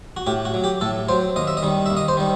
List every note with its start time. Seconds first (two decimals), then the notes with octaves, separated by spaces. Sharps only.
0.17 F#4
0.27 A2 G4
0.45 F#4
0.54 F#3
0.64 G4
0.81 A2 A4
1.09 F#3 C5
1.36 D#2 D#5
1.47 E5
1.57 D#5
1.63 D#3 G3
1.86 D#2 E5
1.97 D#5
2.08 C5
2.17 D#3 G3